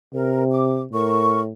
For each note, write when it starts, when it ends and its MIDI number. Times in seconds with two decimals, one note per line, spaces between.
0.14 0.86 48
0.14 0.42 70
0.52 0.80 86
0.93 1.53 45
0.93 1.40 70
0.93 1.40 85